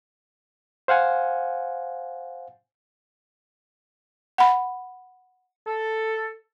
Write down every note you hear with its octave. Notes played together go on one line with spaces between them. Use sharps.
C5 F5 F#5 G#5
F#5 B5
A4